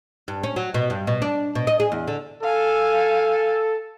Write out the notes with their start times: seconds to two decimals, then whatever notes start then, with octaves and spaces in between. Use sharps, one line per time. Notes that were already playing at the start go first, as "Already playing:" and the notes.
0.28 G2
0.43 C#4
0.56 F#3
0.74 B2
0.90 G2
1.07 B2
1.22 D4
1.55 B2
1.67 D#5
1.80 G#4
1.92 E2
2.08 D3
2.43 A4 F5 G#5